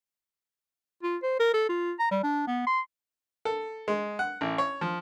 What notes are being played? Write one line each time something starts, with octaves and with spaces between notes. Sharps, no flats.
F4
C5
A#4
A4
F4
A#5
G3
D4
B3
C6
A4
G#3
F#5
A1
C#5
F3